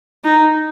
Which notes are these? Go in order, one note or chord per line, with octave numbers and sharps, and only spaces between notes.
D#4